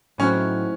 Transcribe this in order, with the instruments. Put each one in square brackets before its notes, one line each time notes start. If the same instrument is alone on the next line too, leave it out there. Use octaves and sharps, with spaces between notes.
[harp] A2 F#3 C4 D#4 F#4 [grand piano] C#4